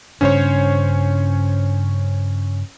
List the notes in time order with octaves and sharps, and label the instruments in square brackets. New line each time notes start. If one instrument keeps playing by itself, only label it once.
[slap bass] G2 C#3 D4 [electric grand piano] C#4 C5 C#5